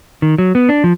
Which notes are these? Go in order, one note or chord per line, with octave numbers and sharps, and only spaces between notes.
D#3
F#3
B3
D4
F3